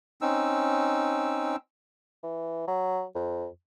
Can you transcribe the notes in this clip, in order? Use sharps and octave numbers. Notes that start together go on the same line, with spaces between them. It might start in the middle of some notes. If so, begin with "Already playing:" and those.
C4 C#4 D#4 E6
E3
F#3
F2